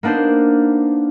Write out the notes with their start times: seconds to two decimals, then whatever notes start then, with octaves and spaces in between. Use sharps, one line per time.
0.03 A#3 B3 D4 D#4 C5